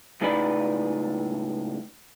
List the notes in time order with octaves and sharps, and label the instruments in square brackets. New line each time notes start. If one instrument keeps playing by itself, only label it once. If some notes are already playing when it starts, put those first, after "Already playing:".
[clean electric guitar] C#2 A2 D#4 B4 D5 B5